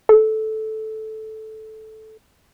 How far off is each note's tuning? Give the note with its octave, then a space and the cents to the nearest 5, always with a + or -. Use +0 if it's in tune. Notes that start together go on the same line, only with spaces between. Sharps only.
A4 -10